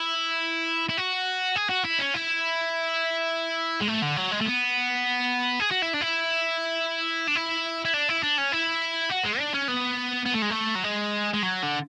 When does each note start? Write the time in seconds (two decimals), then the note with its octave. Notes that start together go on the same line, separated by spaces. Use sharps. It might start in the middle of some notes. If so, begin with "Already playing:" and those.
Already playing: E4
0.89 E4
0.98 F#4
1.56 G#4
1.69 F#4
1.84 E4
1.99 C#4
2.14 E4
3.81 G#3
3.88 A3
4.02 D3
4.17 F#3
4.32 G#3
4.41 A3
4.46 B3
5.60 G#4
5.71 F#4
5.82 E4
5.93 D4
6.01 E4
7.27 D4
7.35 E4
7.85 E4
7.94 D4
8.09 E4
8.23 D4
8.38 C#4
8.53 E4
9.10 F#4
9.25 G#3
9.39 D4
9.54 C#4
9.68 B3
10.26 B3
10.34 A3
10.42 G#3
10.51 A3
10.76 F#3
10.84 G#3
11.33 G#3
11.43 F#3
11.63 D3